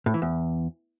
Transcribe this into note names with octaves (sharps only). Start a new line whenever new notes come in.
A2
E3
E2